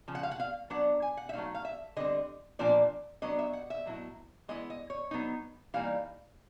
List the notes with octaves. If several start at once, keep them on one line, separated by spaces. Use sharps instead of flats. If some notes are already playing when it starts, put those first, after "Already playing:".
C#3 F3
F#5
F5
F#5
F5
F#3 B3 D4 F#5
G#5
F#5
E5
F#3 A3 C4 D#4 F5
F5
E5
D3 G3 C4 D#5
A#2 F3 A#3 D4 D5
F#3 B3 D4 D#5
E5
F#5
E5
A2 F#3 B3 E4
E3 G#3 B3 E4 D#5
D#5
C#5
F#3 B3 D#4
E3 G3 A#3 D#4 F5